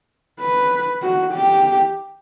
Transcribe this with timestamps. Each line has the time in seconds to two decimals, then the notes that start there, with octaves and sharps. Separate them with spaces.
0.41 B4
1.01 F#4
1.33 G4